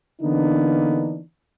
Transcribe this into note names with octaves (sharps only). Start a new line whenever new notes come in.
D3 E3 A#3 B3 D4 D#4